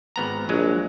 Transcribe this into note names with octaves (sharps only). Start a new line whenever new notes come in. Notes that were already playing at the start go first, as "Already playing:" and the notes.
G#1 B3 A#5
A#1 F#3 G#3